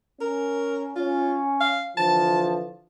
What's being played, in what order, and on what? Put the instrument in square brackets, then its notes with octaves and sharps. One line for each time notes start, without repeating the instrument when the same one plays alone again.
[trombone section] C#4 [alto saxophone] A#4
[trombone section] C#4 [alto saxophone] F4
[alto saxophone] F5
[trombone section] D3 E3 F3 [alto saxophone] A5